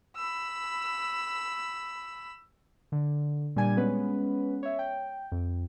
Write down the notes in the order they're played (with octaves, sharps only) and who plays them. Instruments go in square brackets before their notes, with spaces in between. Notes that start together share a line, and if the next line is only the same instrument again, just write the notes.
[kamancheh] B5 E6
[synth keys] D3
A#2 G3 D4 G#5 G#6
G#3 B3 C#4 B4
C#5 E5
G5
F2